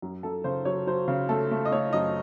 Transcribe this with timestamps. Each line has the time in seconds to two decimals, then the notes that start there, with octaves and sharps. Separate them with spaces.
0.02 F#2
0.23 F#2 A4
0.44 C#3 C5
0.65 F#3 C#5
0.87 F#3 C5
1.08 C#3
1.29 A3 A4
1.51 A3
1.65 D#5
1.72 A3 C#5
1.93 F#2 D#5